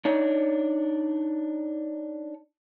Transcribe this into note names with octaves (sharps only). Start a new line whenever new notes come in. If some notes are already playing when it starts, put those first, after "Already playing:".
D4 D#4 C#5